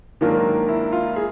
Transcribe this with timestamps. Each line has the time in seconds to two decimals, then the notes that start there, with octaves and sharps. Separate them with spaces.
0.21 G#2 D#3 F#3 A#3 D4 F4
0.68 E4
0.92 F4
1.16 G#4